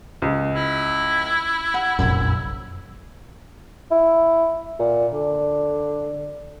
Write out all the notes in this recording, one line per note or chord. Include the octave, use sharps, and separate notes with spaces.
C#2
E4
F#5
F1 A#1 F#2
E4
A#2
D3